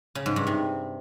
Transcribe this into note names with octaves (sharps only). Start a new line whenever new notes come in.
C#3
G#2
G2
C3